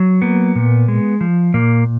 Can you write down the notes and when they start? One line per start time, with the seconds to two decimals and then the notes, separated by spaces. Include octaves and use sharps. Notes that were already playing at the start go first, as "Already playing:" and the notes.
Already playing: F#3
0.22 A#3 B3
0.55 A#2
0.88 G#3
1.21 F3
1.54 A#2 A#3